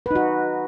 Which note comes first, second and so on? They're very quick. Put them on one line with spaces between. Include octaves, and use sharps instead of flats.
B4 D#4 F#4